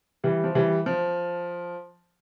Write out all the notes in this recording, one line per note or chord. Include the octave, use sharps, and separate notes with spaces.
E3 G3
F3
E3 G3
F3